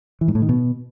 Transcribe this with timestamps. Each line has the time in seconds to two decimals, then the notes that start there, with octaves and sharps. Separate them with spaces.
0.21 E3
0.28 G#2
0.35 A2
0.42 D#3
0.49 B2